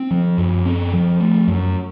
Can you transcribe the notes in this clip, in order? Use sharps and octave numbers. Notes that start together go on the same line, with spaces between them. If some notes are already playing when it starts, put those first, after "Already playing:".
Already playing: C4
F3
F#2
C4
F3
A3
F#2